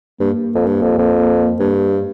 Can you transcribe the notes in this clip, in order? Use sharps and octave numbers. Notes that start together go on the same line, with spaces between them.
G2 A#3
F2
G2
F2
F2
G2